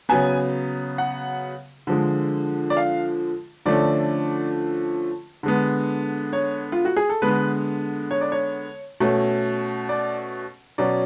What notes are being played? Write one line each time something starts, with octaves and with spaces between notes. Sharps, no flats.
C#3 F#3 B3 G#5
F#5
D3 F3 G#3
D5
F5
D3 F3 A3 C#4 D5
D3 G#3 B3
C#5
F4
F#4
G#4
A4
D3 G#3 B3 B4
C#5
D5
C#5
B2 A3 C#4
D5
B2 F#3 C#4 D5